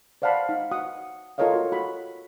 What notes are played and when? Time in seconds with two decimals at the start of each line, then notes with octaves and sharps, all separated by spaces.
0.22 C5 D5 F5 F#5 A5 B5
0.49 D#4 F5
0.71 F#4 F#5 D#6
1.38 F4 A4 A#4 C#5 D#5 F5
1.54 F#4
1.72 F#4 B5